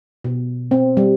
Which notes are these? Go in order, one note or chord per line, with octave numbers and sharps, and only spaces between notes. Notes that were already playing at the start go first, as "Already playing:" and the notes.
B2
C4
G3